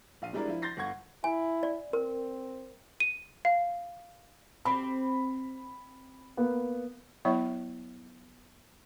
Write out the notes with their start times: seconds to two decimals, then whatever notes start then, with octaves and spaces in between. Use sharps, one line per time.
0.22 A#1 F5 D#7
0.33 G3 G#3 D4 E4 A#4 D5
0.48 F3 E4
0.62 C6 G6 A6 A#6 C7
0.77 G1 F#5 C#6 G#6
1.24 E4 G#5
1.63 D5
1.93 C4 A#4
3.00 D#7
3.45 F5
4.65 C4 G4 B5
6.37 A#3 B3
7.25 F#3 B3 E4 C#5 E5 C#6